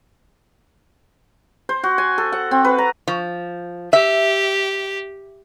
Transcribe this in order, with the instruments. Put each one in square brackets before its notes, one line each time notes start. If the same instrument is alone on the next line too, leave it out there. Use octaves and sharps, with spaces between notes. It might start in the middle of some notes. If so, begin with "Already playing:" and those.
[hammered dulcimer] C5
F#4
G#5
A4
F#5
C4
B4
A#5
[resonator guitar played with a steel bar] F3
[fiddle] G4 [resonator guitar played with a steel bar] E5